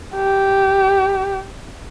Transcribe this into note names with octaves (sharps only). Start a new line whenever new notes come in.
G4